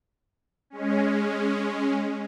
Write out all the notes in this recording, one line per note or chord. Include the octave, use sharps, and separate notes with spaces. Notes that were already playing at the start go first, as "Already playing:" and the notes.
G#3 C#4